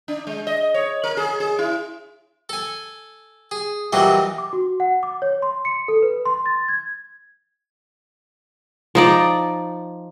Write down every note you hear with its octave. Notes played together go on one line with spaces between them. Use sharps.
D4
G#3
D#5
C#5
A#4
G#4
G#4
E4
A4 G#5
G#4
A#2 E3 F#3 G3 D4 D#4
D6
F#4
F#5
D6
C#5
C6
C#7
A4
B4
C6
A6
G#6
F3 D#4 D5